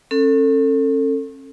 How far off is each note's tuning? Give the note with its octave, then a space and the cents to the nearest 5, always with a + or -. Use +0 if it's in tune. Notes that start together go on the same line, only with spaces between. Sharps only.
C#4 -40 A4 +25